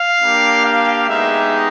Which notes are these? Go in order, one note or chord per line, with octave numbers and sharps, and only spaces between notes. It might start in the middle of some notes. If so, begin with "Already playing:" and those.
Already playing: F5
A#3 D4 G4
F5
G#3 B3 D#4 G4 E5